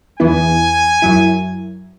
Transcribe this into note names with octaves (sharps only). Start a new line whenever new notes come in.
E2 E3 B3 E4 G#5
F#2 F#3 E4